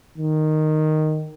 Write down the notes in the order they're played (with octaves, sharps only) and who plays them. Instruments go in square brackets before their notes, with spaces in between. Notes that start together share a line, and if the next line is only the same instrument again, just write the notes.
[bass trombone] D#3